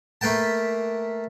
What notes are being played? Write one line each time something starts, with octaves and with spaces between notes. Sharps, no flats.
A3 A#3 B4 G5 A5